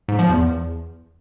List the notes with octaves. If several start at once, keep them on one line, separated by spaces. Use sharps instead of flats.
G#2
F3
E2